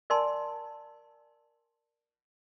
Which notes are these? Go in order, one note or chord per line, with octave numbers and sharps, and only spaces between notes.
A#4 D5 G#5 A5 C6